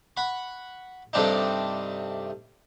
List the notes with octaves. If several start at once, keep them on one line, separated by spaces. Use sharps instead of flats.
F#5 B5 C#6
G2 C3 A3 C4 D4 D#4